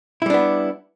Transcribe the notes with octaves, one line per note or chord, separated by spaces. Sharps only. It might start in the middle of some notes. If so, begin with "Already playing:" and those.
G3 B3 D4 E4